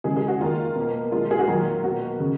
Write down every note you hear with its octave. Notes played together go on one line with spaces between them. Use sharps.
C#3 G#3 G#4
G#4
F#4
D#3 A#3 F4
B2 A#3
A#2 G#3 F4
G#4
F#4
D#3 F#3 A#3 F4
B2 A#3 F#4
C#3